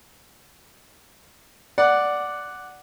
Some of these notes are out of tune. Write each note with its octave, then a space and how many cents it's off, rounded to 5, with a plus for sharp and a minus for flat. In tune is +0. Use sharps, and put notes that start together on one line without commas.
D5 +0 F#5 +0